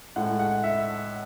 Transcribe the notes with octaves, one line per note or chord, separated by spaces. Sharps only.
A2 G#3 F#5
F#5
E5